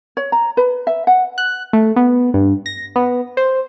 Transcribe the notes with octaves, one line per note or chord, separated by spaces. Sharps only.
C#5
A#5
B4
E5
F#5
F#6
A3
B3
G2
A#6
B3
C5